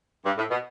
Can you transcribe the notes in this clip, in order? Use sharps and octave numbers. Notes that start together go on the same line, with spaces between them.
G2
A2
B2